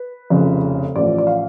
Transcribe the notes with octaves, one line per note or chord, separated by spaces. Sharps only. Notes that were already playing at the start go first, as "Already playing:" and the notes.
Already playing: B4
F1 F2 C#3
A1 A2 F3 D5
D5
F5